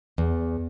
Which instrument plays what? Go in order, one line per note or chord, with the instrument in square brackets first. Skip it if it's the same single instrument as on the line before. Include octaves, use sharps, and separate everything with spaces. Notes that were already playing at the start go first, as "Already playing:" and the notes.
[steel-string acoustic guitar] E2